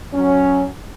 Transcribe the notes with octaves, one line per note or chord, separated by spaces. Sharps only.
F#3 C#4